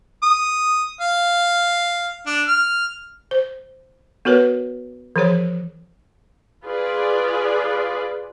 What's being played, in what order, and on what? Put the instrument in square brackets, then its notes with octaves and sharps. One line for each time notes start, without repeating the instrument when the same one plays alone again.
[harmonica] D#6
F5
D4
F6
[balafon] C5
B3 F#4 A#4 B4 C#5
E3 F3 G#4 C#5
[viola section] F4 G#4 B4 D5